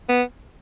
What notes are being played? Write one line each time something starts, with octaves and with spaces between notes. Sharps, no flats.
B3